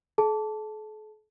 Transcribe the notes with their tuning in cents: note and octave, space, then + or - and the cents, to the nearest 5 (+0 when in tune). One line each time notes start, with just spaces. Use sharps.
A4 -45 A5 +0